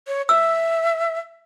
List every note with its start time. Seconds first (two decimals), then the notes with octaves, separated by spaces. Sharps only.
0.07 C#5
0.29 E5 E6